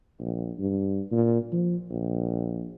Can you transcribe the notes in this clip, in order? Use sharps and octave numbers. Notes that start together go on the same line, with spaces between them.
A#1
G2
A#2
F3
A#1